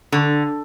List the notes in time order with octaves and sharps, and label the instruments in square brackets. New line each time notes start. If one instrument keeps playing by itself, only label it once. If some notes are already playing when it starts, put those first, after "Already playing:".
[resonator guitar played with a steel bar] D3